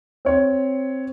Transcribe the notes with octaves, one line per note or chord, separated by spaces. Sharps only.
C4 C#5